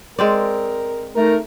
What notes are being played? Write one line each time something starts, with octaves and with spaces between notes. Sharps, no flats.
G#3 C4 A#4 D5
A3 D#4 A#4